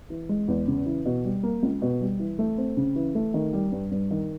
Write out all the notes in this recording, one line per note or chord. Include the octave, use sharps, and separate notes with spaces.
E3
G#3
E2
C#3
E3
B2
G3
A#3
C#2
B2
G3
E3
A3
C4
C#3
E3
A3
D#3
G3
G2
G2
D#3